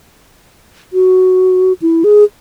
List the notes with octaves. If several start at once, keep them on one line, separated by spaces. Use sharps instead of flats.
F#4
E4
G#4